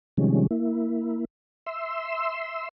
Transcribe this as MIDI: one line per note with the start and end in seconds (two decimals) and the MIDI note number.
0.17 0.47 48
0.17 0.47 51
0.17 0.47 53
0.17 0.47 55
0.17 0.47 56
0.17 0.47 61
0.51 1.25 58
0.51 1.25 64
1.66 2.69 76
1.66 2.69 84
1.66 2.69 88